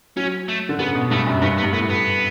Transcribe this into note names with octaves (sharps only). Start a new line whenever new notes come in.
F#3 C#4
A3
D3
C#3 B3
B2
G2 A3
F#2
G2 B3
B3
G2
A2 B3
B3